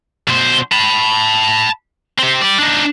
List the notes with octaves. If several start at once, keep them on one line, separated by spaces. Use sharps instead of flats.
B2 C5
A5 B5
C4 G4
G3 D5
D4 D#4